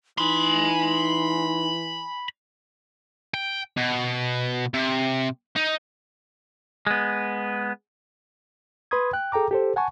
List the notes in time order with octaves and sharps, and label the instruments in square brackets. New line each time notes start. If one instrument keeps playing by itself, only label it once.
[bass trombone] E3 [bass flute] D#4 [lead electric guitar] G#5 C6 [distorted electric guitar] B5
[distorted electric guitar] G5
B2
C3
D#4
[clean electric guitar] G#3 B3
[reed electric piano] B4 B5 C6 D#6 G#6
G5 F#6
G#4 A4 G5 A#5 D6
G4 A4 C5
F#5 G#5 A5 C#6